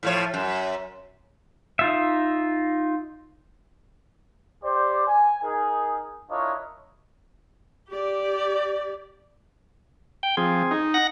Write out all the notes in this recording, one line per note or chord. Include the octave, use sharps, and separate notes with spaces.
A2 F3 C#5
F#2
D#4 F4 E5
G4 C5 D5
G#5
D#4 G#4 A#4
D4 E4 F4 A#4 C#5 D#5
G4 D5
G5
F3 C4 G#4
D#4
F#5 A#6